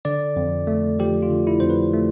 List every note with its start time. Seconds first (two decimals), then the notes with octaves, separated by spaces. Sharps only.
0.05 D3 D5
0.36 F2
0.67 A3
0.99 F3 G4
1.22 F4
1.30 D3
1.47 E4
1.60 F2 C5
1.70 B4
1.94 A3